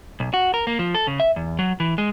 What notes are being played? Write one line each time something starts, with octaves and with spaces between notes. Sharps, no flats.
B1
F#4
A#4
A#3
F3
A4
C#3
E5
E2
F#3
E3
G#3